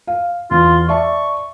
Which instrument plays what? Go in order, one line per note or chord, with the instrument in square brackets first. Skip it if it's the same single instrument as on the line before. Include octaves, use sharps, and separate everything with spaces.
[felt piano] F5
[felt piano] E2 [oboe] F4
[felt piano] D5 E5 A5 [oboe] C#6